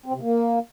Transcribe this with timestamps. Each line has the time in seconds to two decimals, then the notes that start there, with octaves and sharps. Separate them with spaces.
0.06 C4
0.14 C3
0.22 A#3